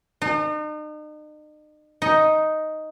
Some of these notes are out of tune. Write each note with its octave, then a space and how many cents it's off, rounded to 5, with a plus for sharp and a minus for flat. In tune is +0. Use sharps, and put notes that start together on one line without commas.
D#4 -40
D#4 +5